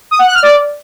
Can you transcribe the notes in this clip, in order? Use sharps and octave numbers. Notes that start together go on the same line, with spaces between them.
D#6
F#5
F#6
F6
D5